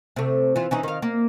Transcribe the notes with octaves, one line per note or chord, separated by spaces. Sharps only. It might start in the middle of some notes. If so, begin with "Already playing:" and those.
C3 A3
E3 F4
E3 C#4 D#4
D#3 F5
A#3